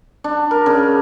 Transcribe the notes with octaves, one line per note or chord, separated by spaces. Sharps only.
D4
A#4
C#3